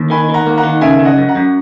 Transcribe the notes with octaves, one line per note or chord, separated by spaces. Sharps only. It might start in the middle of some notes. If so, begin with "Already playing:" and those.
Already playing: D#2
D#3 G#5 B5
D#3
F#5 A#5
A#3
F#5 A#5
D#3
C#3 E5 G#5
C#3
D#5 F#5
F#2
F#5 A#5
F#2